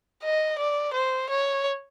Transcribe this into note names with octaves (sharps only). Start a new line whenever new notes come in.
D#5
D5
C5
C#5